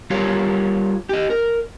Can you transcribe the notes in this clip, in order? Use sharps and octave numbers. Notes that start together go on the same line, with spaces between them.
G3 F4 G4 A#4 C#5 F5
G4 D#5
A#4